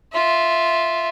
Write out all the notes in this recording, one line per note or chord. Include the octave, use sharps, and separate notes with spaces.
F4 E5